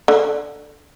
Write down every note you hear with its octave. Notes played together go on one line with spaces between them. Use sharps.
D3